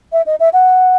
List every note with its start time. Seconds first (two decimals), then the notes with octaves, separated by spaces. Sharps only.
0.13 E5
0.26 D#5
0.40 E5
0.53 F#5